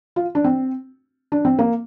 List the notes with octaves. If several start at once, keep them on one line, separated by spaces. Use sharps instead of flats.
F4
D4
C4
D4
C4
A#3